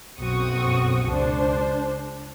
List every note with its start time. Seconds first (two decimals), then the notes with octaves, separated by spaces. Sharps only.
0.20 B1 F#2 C4 F#4 C#6 D#6
1.07 C#2 D4 C5